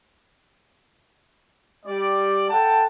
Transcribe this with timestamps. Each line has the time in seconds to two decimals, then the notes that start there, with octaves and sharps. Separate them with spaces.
1.86 G3 D5
2.49 A4 F#5 G5 A5